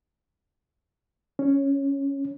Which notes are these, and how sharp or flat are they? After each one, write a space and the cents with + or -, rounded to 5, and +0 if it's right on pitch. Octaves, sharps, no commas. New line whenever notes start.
C#4 +0